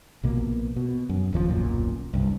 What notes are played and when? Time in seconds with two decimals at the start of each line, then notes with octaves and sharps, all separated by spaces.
0.23 A#1 B2 A#3
0.76 B2
1.09 F#2
1.33 D#1 D#2 D#3 F3
1.49 D#1 B1 F#2 A#2
2.14 C2 G2